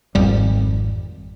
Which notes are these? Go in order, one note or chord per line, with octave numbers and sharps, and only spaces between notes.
G#1 F2 G3